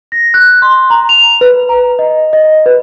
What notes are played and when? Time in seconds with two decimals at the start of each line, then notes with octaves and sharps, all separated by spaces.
0.12 A#6
0.34 F#6
0.62 C6
0.90 A#5
1.09 F7
1.41 B4
1.69 A#5
1.99 D#5
2.33 D#5
2.66 B4